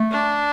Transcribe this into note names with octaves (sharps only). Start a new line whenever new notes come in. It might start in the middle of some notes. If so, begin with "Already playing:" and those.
Already playing: A3
D4